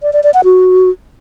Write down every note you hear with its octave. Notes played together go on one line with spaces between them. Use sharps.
D5
D5
D5
F#5
F#4